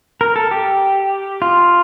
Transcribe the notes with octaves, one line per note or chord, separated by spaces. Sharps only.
A#4
A4
G4
F4